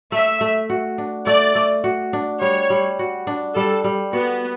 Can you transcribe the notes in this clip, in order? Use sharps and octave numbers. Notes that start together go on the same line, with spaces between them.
A3 E5
A3
F#4
D4
A3 D5
A3
F#4
D4
G3 C#5
G3
F#4
D4
G3 A4
G3
B3 F#4